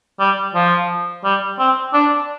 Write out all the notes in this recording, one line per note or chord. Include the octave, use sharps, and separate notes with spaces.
G3
F3
G3
C4
D4